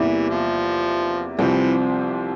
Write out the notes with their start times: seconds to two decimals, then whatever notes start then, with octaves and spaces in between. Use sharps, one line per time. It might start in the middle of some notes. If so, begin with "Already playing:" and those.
Already playing: E2 C3 E3 G3 A#3 E4
0.29 F3
1.39 C2 C3 E3 F3 C4